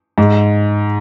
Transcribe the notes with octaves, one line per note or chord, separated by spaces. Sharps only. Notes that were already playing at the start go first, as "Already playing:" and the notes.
G#2